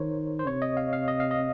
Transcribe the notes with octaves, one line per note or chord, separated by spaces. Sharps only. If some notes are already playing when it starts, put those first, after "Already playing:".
Already playing: D#3 A#4 C5 C#5
C5
C3 C#5
D#5
F5
F5
D#5
F5
D#5